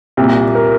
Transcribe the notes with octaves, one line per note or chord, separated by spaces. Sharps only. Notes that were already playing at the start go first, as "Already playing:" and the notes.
C2 A#2 G4
A#4